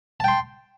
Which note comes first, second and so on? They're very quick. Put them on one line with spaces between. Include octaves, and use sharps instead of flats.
A5 G5 C6